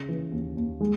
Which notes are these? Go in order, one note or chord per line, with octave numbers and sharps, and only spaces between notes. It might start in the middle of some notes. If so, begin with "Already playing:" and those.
Already playing: C#3
E3
D#2
D#2
G#3